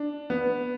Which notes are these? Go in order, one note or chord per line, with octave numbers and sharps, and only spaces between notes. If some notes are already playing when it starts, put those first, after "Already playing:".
Already playing: D4
B3